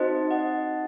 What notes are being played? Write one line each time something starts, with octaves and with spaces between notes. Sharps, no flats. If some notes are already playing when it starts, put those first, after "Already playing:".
Already playing: C4 D#4 F#4 C5 D#5
D#5 F#5